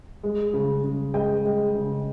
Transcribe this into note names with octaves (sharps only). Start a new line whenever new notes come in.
G#3
C#3
C#3
G#3 D#5 G5
G#3
C#3